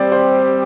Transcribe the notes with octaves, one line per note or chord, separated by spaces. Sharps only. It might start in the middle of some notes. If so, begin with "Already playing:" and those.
Already playing: G3 C4 G4 C5 D5
C5